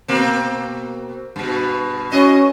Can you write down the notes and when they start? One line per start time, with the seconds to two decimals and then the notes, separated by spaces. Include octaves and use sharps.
0.08 B2 A#3 C4
1.36 G2 B2
2.12 C#4 E4 F#4 D#5